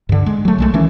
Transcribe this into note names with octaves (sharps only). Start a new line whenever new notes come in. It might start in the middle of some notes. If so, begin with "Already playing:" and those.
G2 D3
G#3
F#3 A3
B1 G#3 A3
D#3 E3 A3 C#4